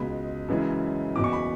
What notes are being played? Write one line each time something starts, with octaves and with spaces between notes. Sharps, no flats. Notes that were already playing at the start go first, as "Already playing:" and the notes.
Already playing: C#2 B2 G#3 B5
F#2 C#3 E3 G#3
F#1 E2 B2 D6
C#6
B5